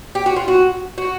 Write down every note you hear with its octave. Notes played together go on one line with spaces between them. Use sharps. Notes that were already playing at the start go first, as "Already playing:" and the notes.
G4
F#4
F4
F#4
F#4